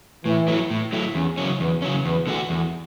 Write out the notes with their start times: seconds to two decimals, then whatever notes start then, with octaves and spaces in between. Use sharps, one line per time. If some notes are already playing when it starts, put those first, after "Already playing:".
0.25 A2 E3
0.48 F#3 A3 E4
0.70 A2
0.92 F#3 A3 E4
1.15 E2 C#4
1.37 C#3 F#3 C#4
1.60 E2 B4
1.82 C#3 F#3 C#4
2.05 E2 B4
2.27 D3 A3 D4 F#4
2.49 E2 A4